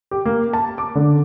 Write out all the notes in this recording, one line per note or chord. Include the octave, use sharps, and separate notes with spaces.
G4
A#3
A5
D6
D3